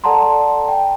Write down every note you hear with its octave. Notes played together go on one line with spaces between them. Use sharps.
A4 D5 F#5 A5 A#5 C6
G5